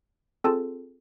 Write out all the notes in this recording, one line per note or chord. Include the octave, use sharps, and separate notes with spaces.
C4 F4 G#4 A4 A5